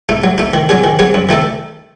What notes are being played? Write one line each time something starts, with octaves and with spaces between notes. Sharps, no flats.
A3 D#4
F#3
A3 D#4
D#3
F#3 C#4 G#4
D#3
F#3 C#4 G#4
F#2
D#3 A3 D#4 A4